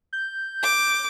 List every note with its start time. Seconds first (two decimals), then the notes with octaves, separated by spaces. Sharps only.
0.13 G6
0.62 D6